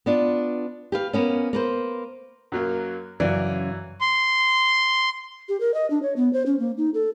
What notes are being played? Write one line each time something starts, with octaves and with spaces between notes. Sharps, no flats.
B3 D4 F4
G4 B4 F5
A#3 B3 C#4
A#3 B4 C5
F#2 F#3 A#3
F#2 C#3 E3 F#3 D5
C6
G4
A#4
D#5
D4
C#5
B3
C5
C#4
A#3
D#4
A4